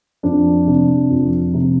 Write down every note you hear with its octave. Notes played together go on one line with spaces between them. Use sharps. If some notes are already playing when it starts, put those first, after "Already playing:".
F2 D4
C3
F2
C3